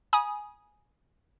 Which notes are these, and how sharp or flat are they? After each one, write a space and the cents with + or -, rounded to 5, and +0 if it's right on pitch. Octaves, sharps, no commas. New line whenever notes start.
G#5 +5 B5 -40 D#6 +0